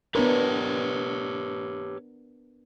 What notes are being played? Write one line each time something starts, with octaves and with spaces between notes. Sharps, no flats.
B3 D4 G4 A#4 B4 C#5